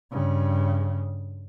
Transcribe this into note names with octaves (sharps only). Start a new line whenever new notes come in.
G2 C#3